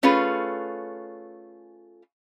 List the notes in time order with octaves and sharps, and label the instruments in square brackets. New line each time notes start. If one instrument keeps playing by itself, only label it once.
[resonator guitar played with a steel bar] A3 C#4 F4 G#4 B4